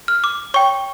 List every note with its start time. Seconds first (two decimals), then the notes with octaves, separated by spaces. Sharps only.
0.08 F6
0.24 D6
0.54 C#5 G5 C#6